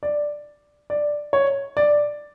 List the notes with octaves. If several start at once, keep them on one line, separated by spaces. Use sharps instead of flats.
D5
D5
C#5
D5